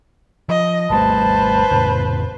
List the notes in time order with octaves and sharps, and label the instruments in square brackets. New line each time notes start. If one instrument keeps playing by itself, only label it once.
[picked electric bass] F3 [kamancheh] D#5
[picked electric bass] G#1 G3 A3 [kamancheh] B4 C5 [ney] A5
[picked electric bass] F2 A2 C#3